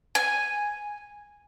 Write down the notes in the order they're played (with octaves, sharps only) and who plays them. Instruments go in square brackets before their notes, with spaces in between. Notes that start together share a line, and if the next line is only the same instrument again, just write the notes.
[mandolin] G#5